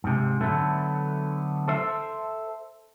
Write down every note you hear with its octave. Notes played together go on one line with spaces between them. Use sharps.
G#2 C3
D3 F#3 A3 B3 A4
A4 C5 E5